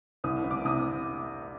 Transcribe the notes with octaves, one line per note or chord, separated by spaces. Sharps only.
C2 D#6
C2
D6
C3 D#6